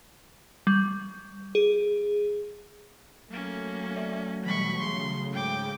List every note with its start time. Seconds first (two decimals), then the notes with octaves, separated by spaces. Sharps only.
0.67 G3
1.55 G#4
3.31 F#3 A3 A#3 C#4
3.96 D5 E5
4.45 B2 E3 G3 B5 C#6
4.80 C#3 C6
5.33 G#2 G5 D6